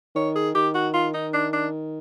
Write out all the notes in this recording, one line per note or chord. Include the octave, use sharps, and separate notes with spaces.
D#3 C#5
G#4
D#3 G4
F#4
F4
D#4
D4
D4